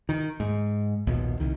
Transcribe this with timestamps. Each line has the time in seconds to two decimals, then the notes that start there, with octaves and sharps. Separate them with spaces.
0.09 D#3
0.40 G#2
1.07 A#1 D#2 B2
1.40 C2 D#3